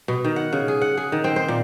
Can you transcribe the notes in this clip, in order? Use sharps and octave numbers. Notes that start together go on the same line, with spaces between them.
B2
D#3
F#5
C#3
G#4
F#5
G#4
D#3
C4
C5
A#2